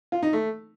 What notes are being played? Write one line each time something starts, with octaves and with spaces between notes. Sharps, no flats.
F4
D#4
A3